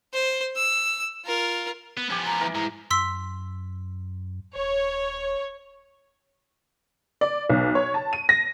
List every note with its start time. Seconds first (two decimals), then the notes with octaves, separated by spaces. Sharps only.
0.14 C5
0.56 E6
1.25 F4 A#4
1.97 B3
2.10 F3 B3 G4 G#5
2.26 A#5
2.41 E3 A#4
2.55 G#2 G#3 A#5
2.91 F#2 C6 E6 B6
4.56 D#1 C#5
7.21 D5
7.50 B1
7.75 C#5
7.94 A5
8.13 D#7
8.29 A#6